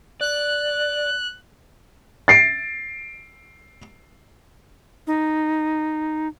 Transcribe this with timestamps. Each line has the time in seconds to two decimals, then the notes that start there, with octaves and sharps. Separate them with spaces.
0.21 D5 F#6
2.28 A6 C7 D7
5.07 D#4